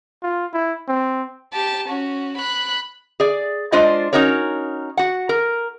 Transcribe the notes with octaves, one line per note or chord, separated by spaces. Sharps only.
F4
E4
C4
G4 A5
C#4 F#4
B5 F#6
G#4 D5
G#3 D4 F4 C5 D5 D#5
C#4 D#4 F#4 A#4 C#5
F#4 F#5
A#4